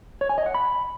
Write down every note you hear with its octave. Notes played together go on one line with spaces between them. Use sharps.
C#5
G#5
D#5
F#5
B5